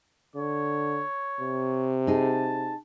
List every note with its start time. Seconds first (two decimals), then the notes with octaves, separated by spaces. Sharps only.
0.35 D3 C#5
1.41 C3
2.07 D#4 G#4 A5